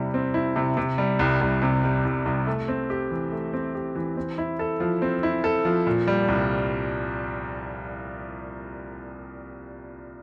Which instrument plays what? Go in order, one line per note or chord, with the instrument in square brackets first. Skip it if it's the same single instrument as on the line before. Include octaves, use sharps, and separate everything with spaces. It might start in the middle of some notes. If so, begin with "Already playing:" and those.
Already playing: [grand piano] C3 G3 C4 E4
C4
E4
C3
C3
G3
C2
C2
C3
G3
C2
C2
A3
C4
G4
E3
A3
C4
G4
E3
C4
E4
A4
F3
C4
E4
A4
F3
A#2
G3
C2